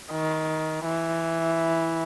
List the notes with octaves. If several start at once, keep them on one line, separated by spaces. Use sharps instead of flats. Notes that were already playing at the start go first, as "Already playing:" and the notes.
D#3
E3